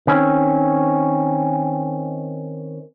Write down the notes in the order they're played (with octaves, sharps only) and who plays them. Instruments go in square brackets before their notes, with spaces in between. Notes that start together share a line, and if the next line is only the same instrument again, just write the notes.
[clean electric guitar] D#3 C4 C#4